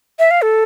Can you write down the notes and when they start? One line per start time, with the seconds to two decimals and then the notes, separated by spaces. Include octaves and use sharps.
0.19 E5
0.31 F5
0.42 A4